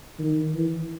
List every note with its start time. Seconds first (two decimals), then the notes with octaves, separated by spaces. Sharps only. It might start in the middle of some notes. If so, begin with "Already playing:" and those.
0.19 D#3
0.54 E3